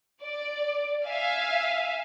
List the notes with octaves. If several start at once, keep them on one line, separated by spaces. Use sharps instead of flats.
D5
E5 F5 G#5